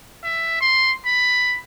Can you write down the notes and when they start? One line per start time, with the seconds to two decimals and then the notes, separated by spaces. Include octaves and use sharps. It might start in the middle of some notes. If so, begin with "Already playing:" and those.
0.24 E5
0.61 C6
1.06 B5